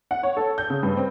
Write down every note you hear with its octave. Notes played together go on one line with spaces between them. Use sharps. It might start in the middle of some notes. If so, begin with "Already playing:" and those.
F#5
C#5
A4
G6
C#3
G2
C4